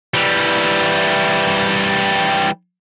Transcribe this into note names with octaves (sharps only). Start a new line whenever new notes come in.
E3 G3